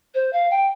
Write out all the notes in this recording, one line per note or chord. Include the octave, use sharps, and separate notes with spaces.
C5
F5
G5